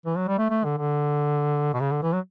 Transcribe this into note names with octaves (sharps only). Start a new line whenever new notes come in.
E3
F#3
G3
A3
A3
D3
D3
B2
C#3
D3
E3
F#3